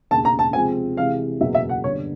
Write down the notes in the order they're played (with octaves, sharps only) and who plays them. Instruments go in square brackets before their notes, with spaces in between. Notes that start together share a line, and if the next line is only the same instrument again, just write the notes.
[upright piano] E1 D#2 C#3 [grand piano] A5
[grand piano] A#5
A5
[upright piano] C3 F3 G#3 C4 [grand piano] G#5
[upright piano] C3 E3 G#3 [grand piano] F5
[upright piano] F#1 E2 B2 F#3 [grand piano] E5
[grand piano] E5
F#5
[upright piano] G1 G2 D3 [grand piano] C#5